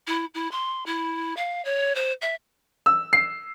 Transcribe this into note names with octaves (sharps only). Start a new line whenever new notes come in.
E4
E4
C6
E4
F5
C#5
C5
E5
E6
C7